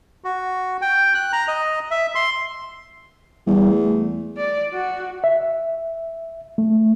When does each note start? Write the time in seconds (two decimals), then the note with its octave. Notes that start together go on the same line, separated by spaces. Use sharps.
0.24 F#4
0.81 G5
1.15 F#6
1.33 A#5
1.48 D#5
1.91 E5
2.15 C6
3.47 E2 G3
3.71 A3
4.37 D5
4.73 F#4
5.24 E5
6.58 A3